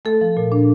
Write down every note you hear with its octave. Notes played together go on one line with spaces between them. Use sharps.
A3 A4
F3
A#2
D4